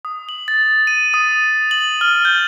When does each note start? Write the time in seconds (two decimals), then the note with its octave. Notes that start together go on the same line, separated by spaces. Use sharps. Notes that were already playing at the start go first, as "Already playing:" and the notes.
0.05 D#6
0.29 F#7
0.48 A6
0.87 D#7
1.14 D#6
1.44 D#7
1.71 F#7
2.01 F6
2.25 G6